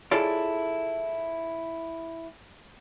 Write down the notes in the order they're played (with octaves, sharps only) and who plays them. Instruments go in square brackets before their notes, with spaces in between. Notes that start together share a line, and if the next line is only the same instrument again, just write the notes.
[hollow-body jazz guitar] E4 F4 G#4 A4 C#5 D5